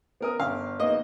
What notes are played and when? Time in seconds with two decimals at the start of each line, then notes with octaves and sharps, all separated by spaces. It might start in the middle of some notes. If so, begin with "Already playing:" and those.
0.21 B3 A#4 D#6
0.40 G1 F5
0.80 A#3 B3 D#4 D#5